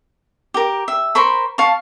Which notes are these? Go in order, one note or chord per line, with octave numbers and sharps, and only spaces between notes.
G4 A#4
E5
A#4 C5 B5 C#6
F5 A5 C#6